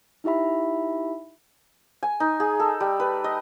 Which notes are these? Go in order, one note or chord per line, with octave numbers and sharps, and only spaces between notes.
D#4 E4 G4 E5 B5
G#5
D#4
G#4
A4
G3
B4
D#5